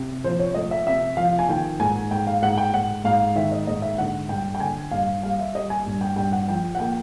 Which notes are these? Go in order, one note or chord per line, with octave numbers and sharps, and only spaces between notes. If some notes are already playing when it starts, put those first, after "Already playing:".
Already playing: C3
F3 C5
C#5
A3 D#5
E5
C3 E5
F3 F5
G#5
D#3 G5
G#2 G#5
G#2 G5
F5
G#2 F#5
G5
G#2 F#5
G#2 F5
D#3 E5
D#5
G#2 D#5
E5
D3 F#5
G2 G5
G5
D3 G#5
G2 F5
G3 F5
E5
G3 D#5
G#5
G2
G5
G2 G5
F#5
F3 G5
F#5
A#3 G5